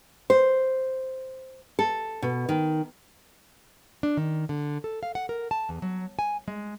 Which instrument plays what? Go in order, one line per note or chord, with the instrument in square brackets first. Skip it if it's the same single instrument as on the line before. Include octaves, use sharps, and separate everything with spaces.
[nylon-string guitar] C5
A4
B2
D#3
D4
D#3
D3
A4
F5
F#5
A#4
A5
E2
F#3
G#5
G#3